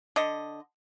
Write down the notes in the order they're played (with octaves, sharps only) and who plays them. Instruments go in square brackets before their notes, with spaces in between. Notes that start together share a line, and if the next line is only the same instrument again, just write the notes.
[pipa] D3 D#5